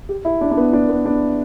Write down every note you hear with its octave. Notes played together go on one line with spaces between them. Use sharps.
G4
E4
D4
D4
B3
D4
B3
D4